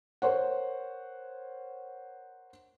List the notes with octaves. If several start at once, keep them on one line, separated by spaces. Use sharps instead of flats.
A#4 C5 C#5 F#5